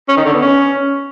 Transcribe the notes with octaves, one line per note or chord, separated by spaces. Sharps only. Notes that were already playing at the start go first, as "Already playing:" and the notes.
C#4
D#3
D3
B3
C#4